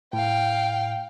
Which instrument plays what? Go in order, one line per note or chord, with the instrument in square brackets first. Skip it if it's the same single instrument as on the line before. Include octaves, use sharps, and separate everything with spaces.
[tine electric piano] A2 [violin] F5 G5